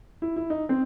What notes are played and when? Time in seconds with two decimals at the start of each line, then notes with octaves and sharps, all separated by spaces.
0.22 E4
0.36 E4
0.50 D#4
0.69 C4